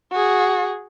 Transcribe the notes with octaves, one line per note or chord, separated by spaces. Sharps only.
F#4 G#4